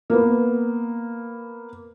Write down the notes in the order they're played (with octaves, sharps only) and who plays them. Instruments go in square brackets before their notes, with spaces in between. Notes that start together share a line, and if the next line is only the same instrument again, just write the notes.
[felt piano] A#3 B3